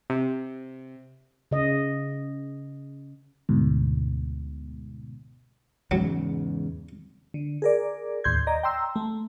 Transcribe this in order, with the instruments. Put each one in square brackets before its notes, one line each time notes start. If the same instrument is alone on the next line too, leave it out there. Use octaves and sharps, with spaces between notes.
[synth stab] C3
[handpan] C#3 D#5
[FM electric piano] D2 G#2 B2
[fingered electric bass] E2 G#2 C#3 [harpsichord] F#3
[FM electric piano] D3
G#4 A#4 D5
D#2 A2 C6 G6 G#6
D5 D#5 A#5
G5 A#5 C6 E6
A3